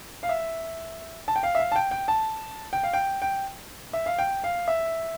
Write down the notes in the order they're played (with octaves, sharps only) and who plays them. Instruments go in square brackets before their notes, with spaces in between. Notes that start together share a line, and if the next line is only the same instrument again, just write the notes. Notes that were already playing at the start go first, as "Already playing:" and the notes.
[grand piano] F5
E5
A5
G5
F5
E5
F5
A5
G5
G5
A5
G5
F5
G5
G5
E5
F5
G5
F5
E5